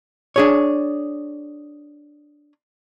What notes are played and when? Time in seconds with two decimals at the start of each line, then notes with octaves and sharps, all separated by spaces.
0.36 D4 G#4 C#5